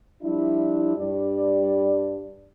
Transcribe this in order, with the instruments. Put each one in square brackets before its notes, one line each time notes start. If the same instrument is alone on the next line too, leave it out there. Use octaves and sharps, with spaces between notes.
[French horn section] F3 G3 D4 E4
G2 G3 D5